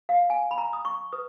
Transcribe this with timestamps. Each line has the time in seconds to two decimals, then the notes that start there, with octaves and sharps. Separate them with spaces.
0.09 F5
0.30 G#5
0.51 B5
0.58 A#5
0.73 D#6
0.85 C#6
1.12 B4 D#6